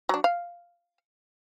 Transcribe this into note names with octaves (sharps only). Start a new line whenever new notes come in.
F#3 D4
F5